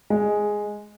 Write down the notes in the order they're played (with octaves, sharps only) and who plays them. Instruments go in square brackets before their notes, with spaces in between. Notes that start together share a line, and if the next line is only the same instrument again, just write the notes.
[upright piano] G#3